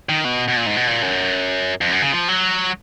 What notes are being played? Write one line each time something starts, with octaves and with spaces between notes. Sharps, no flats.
D#3
B2
B2
A#2
G#2
B2
A#2
F#2
F2
F#2
C#3
F3
F#3